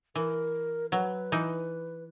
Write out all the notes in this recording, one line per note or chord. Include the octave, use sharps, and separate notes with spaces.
E3 A#4
F#3 B4
E3 D#4